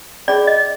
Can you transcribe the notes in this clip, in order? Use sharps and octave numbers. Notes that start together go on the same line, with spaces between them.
C#4 F4 G#4 C#5 D5
D#5